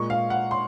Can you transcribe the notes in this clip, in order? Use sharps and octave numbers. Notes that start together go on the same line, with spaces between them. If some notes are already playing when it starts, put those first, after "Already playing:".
Already playing: A#2 G#3 C#6
F5
F#5
C6